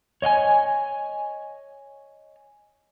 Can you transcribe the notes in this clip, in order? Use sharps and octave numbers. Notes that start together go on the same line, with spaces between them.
C#5 D#5 F#5 G#5